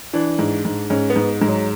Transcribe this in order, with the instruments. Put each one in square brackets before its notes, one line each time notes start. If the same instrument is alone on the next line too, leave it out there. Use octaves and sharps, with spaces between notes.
[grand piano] E3 D4
G#2
G#2
G#2 C#4
B3
G#2
G#2 G#3
F#3